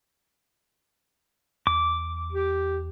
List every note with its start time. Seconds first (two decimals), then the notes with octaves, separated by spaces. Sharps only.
1.67 E2 D6
2.33 G4